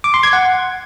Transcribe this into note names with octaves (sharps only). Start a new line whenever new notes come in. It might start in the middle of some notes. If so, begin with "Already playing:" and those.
D6
C6
G#6
F#5